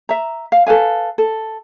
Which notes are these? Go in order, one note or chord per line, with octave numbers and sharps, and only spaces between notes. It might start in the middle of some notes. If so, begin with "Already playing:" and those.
E5 A#5
F5
A4 B4 F5 G#5
A4